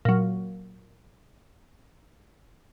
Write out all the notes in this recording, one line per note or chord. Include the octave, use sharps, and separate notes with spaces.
A#2 F#3